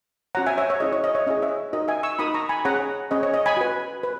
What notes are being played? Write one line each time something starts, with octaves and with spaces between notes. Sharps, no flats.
C#4 F#4 C#5 F#5 A#5
E5 G#5
C#5 E5
C#5 E5
C#4 E4 G#4 D#5
C#5
D#5
C#5 E5
C#4 E4 G#4 D#5
C#5 E5
D#4 F#4 A#4 D#5
E5 G#5
C#6 E6
D#4 F#4 A#4 B5 D#6
A#5 C#6
G#5 B5
C#4 G#4 C#5 F#5 A#5
C#4 G#4 C#5 D#5
C#5
D#5
G#5 B5
F#4 B4
B4